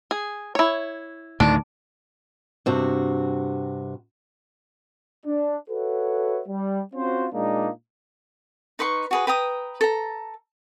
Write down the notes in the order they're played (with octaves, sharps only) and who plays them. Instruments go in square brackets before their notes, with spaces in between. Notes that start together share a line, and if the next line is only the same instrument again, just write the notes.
[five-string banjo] G#4
E4 C#5
[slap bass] D2 A2 D#3 [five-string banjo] D4
[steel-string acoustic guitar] G2 C3 F#4
[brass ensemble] D4
F#4 A4 B4 C#5 E5 F#5
G3
C4 C#4 F4 F#4 C5
A#2 G#3 A#3 D4 D#4
[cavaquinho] D#4 B4 C6 C#6
F#4 G#4 B4
B4 G5 A#5 D#6
A4 A#5